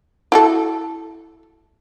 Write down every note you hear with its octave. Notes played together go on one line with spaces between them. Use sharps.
E4 F#4 A4